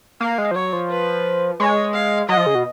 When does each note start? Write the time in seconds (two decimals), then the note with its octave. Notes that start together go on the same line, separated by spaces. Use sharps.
0.20 A#3 F5
0.38 G#3
0.51 F3
0.55 F#3 C#5
0.73 F3
0.90 B4
1.60 G#3 C#5
1.94 F5
2.29 F#3 D#5
2.37 F3
2.46 C#3
2.55 B2